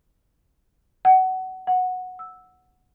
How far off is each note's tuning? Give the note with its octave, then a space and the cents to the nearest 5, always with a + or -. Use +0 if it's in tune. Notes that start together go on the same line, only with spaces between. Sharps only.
F#5 +20
F#5 -10
E6 -5